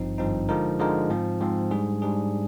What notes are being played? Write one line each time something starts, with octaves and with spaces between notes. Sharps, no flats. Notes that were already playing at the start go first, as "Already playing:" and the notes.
Already playing: G#1 G2 F3 C4 D#4
G#1 G2 F3 C4 D#4
D3 F3 G#3 D#4 A#4
D3 F3 G#3 D#4 A#4
G#2 F3 C4
G#2 F3 C4
G#2 G3 D4 G#4
G#2 G3 D4 G#4